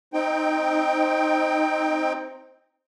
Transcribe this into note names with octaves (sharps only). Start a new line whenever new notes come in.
C4 D#4 G5